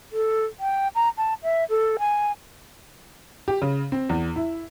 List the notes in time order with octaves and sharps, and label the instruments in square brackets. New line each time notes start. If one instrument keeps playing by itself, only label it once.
[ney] A4
G5
A#5
A5
E5
A4
G#5
[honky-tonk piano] G4
C#3
C4
E2
E4